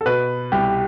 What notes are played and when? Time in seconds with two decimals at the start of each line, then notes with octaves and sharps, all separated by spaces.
0.01 A4
0.06 B2 B4
0.52 C2 G4